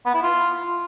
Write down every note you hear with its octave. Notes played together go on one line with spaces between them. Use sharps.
B3
E4
F4